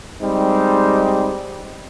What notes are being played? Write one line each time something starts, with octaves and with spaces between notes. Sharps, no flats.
G3 G#3 C4 D#4